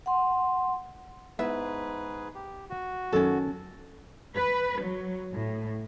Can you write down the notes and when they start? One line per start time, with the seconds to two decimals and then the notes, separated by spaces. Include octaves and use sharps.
0.06 F#5 C6
1.39 G#2 G#3 B3 E4 G#4 B4 E5
2.35 G4
2.70 F#4
3.13 F#2 D#3 F#3 C#4 A4
4.34 B4
4.80 F#3
5.32 A2